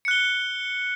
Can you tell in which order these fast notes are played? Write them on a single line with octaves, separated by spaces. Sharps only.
C#7 F#6 G7